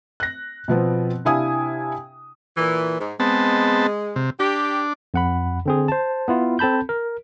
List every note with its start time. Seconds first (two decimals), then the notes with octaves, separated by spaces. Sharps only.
0.20 F#6 A#6
0.68 B2 F3 B3 C4
1.25 C3 D4 E4 F5 G#5 D#6
2.57 A#2 E3
3.00 G#2
3.20 G#3 B3 C4 A5
4.16 C3
4.40 D4 G4
5.14 F2 F#5 B5
5.66 D3 C4 G#4
5.88 C5 A5
6.28 B3 E4 F4
6.59 C4 A4 A5 B5 G6
6.89 A#4